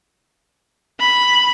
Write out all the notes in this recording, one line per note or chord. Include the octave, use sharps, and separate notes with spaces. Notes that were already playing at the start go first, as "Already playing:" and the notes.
B5